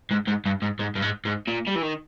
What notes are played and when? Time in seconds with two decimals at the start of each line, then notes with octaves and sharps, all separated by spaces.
0.11 G#2
0.28 G#2
0.46 G2
0.62 G#2
0.79 G#2
0.95 G2
1.02 G#2
1.25 G#2
1.47 A#2
1.67 G3
1.75 E3
1.82 D#3